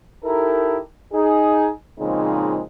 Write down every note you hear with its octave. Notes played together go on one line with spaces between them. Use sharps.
D#4 E4 G4 A4 A#4
D#4 G#4
A#2 C#3 F3 G#3 C4 D#4